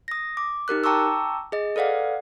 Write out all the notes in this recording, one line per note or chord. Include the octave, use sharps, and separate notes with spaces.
D#6 A#6
D6
D#4 G4 A#4 F#6
G5 A5 A#5 C#6 D6 E6
G#4 D#5
A4 B4 D5 F5 F#5